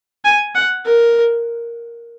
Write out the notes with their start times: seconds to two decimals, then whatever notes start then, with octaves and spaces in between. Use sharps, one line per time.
0.25 G#5
0.55 F#5
0.85 A#4